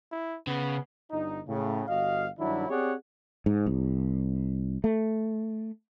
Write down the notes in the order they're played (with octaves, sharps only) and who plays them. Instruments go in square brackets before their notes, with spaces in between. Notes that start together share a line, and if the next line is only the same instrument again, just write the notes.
[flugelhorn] E4
[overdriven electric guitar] C#3 [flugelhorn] B3
[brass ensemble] G1 D#4
A2 C#3
G1 F#4 D#5 F5
G2 D#3 F#3 D4 E4
C4 G4 G#4 C#5 D5 F#5
[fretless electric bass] G#2
C2
A3